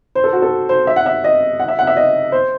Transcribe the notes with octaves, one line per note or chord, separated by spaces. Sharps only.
C5
A4
F#4
A4
C5
E5
F#5
E5
D#5
F#5
E5
F#5
E5
D#5
C5